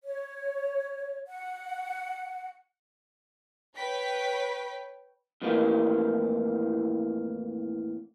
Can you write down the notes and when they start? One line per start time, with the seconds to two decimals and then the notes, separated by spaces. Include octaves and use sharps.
0.03 C#5
1.27 F#5
3.76 B4 C#5 G5 B6
5.42 F2 A2 E3 A#3